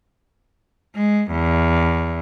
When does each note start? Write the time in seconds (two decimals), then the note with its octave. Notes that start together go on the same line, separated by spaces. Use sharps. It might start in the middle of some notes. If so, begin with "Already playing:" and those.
0.96 G#3
1.32 E2